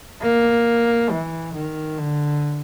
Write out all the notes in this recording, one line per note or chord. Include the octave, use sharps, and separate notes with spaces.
A#3
E3
D#3
D3